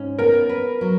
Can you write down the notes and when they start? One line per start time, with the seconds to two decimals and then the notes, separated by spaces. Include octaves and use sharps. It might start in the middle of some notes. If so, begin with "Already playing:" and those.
Already playing: G#2 C#4
0.19 B3 A#4
0.49 B4
0.81 F#3